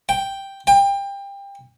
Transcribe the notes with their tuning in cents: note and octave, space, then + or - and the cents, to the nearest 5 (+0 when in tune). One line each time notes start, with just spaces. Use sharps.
G5 +0
G5 +25